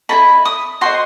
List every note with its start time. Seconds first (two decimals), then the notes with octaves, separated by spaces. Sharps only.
0.09 E4 A4 D#5 B5
0.45 D#6
0.81 F#4 C5 D#5 C6